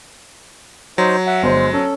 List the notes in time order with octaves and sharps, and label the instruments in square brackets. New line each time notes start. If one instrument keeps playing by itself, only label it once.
[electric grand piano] F#3 [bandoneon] D#4 C5
[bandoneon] E5 F#5
[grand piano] G1 C5 [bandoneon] G#3
[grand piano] C#4 [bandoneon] A4